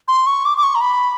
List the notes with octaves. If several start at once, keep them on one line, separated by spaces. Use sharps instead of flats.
C6
C#6
D6
D6
C#6
A#5
B5